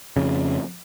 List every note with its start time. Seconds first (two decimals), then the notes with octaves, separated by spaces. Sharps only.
0.17 F2 C#3